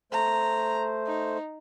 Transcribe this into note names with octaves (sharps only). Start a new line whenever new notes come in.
A3 C5 A#5
D#4